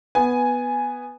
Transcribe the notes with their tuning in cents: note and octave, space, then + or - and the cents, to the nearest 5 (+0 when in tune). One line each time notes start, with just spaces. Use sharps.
B3 +0 G#5 +0